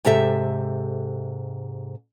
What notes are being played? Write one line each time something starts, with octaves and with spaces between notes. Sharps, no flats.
G#2 C3 G4 A4 E5